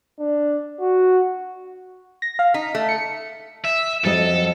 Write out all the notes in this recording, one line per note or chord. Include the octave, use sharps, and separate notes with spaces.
D4
F#4
A#6
F5
D#4 B6
A3
C#7
E5
F2 F#3 A4 D#5